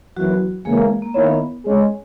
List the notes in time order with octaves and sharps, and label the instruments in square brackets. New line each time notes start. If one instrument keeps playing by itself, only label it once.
[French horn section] F#2 E3 B3 E4 [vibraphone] F#3 F#4
[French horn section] E2 C#3 E3 A#3 [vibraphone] G#3 G#4
[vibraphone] A#3
[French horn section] D#3 A#3 E4 A#4 C#5 [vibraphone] B3
[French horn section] G#3 C#4 G#4